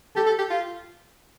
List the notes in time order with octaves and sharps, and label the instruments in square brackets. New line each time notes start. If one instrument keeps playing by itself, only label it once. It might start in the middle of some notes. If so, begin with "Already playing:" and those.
[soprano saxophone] G4 [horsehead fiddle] A4
[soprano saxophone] A4
G4
F4